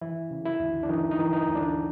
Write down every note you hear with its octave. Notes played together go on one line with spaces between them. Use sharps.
E3 E4
C#3
E4
D2
D4
E3 D#4
D#4
E3
D#4
D2
D4